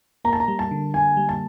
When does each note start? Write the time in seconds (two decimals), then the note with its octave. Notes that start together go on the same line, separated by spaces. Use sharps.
0.25 A#3 A#5
0.33 A5
0.40 A#5
0.48 G3
0.59 A5
0.71 D3
0.94 D3 G#5
1.17 G3
1.29 A5